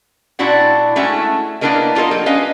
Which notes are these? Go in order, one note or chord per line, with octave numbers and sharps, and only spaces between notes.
A#2 C4 D4 E4 F#4 F#5
G#3 A3 C#4 E4 F#4
A#3 B3 D4 E4 A#4 D#5
A#3 F4 A4 A#4 D#5
F#3 G4
C#4 B4 D#5 F5